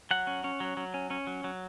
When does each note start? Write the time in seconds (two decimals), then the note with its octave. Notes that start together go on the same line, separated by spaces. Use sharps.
0.11 F#3 F#5
0.27 C#4
0.44 C#4
0.60 F#3
0.77 F#3
0.94 C#4
1.10 C#4
1.27 F#3
1.44 F#3